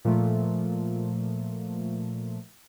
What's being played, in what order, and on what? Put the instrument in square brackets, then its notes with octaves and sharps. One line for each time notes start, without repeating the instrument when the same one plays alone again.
[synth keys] A#2 F3 A3